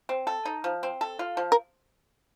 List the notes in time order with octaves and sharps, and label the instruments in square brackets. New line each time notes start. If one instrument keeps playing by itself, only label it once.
[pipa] C4
A4
D#4
F3
C4
A4
F4
F3
[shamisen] A#4